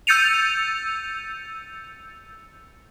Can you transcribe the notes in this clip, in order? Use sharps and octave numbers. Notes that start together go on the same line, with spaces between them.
E6 G6 A6 C#7 D#7 F7